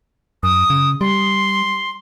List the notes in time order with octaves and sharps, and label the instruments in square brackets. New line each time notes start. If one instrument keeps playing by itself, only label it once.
[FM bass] F#2 [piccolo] D#6
[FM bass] C#3
[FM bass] G3 [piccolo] C6